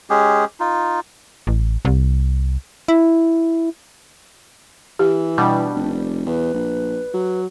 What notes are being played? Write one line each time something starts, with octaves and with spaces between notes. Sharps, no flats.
G#3 C#4 G4 G#4
D#4 F4
A1
C2
E4
E3 G4
B2 G3 D4
F1
E2 B4
A#1
F#3